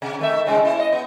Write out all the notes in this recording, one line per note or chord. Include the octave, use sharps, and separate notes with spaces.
C3
D#3 A3 E5
A2 C#3 G#3
A#3 E4
D#5
B3